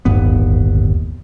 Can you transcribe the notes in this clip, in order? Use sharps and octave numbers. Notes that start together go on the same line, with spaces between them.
D1 G1 D#2 B3